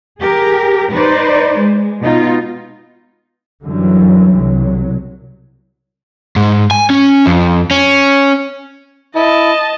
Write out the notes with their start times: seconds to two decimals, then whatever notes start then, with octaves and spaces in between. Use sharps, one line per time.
0.20 G4 G#4 A#4
0.91 D#4 B4 C5 D5
1.58 G#3
2.01 B2 D#4 F4
3.64 F#2 D3 E3 F#3 G3
4.36 C2 F#3
6.36 G#2
6.71 G#5
6.90 C#4
7.26 F2
7.71 C#4
9.15 E4 D#5 A5